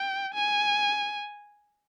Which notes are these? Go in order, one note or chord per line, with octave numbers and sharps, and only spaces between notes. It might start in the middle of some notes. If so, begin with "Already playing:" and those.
Already playing: G5
G#5